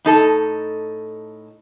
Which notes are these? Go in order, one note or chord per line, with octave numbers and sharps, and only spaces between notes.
A2 D#4 A4 A5